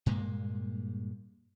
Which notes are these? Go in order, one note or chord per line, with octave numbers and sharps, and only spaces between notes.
G2 A#2 G#3 A#3